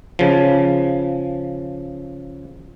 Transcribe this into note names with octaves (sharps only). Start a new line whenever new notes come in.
C#3 F3